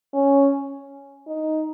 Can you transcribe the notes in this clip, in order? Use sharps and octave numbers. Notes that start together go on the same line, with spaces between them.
C#4
D#4